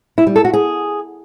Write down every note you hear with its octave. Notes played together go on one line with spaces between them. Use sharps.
E4
G3
A4
F#4
G#4